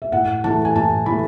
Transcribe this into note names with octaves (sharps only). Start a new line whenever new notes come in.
E5
A2 F#5
E3 A3 A5
G#5
A2 A5
E3 A3 B5